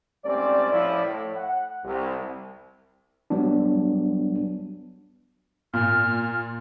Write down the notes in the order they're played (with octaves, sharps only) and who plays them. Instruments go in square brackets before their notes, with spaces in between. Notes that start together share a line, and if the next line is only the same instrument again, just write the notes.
[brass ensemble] G#1 G3 A3 C4 C#4 D5
A2 F3 E4 D5
A2
F#5
C2
[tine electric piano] F#3 G3 B3 D4
[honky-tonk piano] A#2 [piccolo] F6